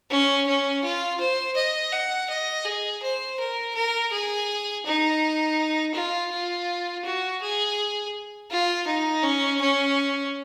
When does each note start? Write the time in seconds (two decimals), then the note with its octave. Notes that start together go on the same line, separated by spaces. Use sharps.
0.10 C#4
0.47 C#4
0.83 F4
1.20 C5
1.56 D#5
1.92 F#5
2.30 D#5
2.65 G#4
3.03 C5
3.40 A#4
3.75 A#4
4.12 G#4
4.86 D#4
5.94 F4
6.31 F4
7.04 F#4
7.41 G#4
8.51 F4
8.87 D#4
9.23 C#4
9.61 C#4